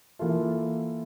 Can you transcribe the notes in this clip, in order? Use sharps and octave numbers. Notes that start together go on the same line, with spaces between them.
E3 A#3 F4 A4